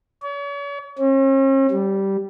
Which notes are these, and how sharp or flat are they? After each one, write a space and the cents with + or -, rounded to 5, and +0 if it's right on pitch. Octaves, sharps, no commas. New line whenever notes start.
C#5 +40
C#4 -45
G3 -10